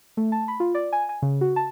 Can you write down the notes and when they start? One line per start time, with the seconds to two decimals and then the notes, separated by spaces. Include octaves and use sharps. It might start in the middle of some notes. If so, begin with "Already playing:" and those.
0.17 A3
0.32 A5
0.48 B5
0.60 F4
0.75 D5
0.93 G#5
1.09 G#5
1.22 C#3
1.41 F#4
1.56 A5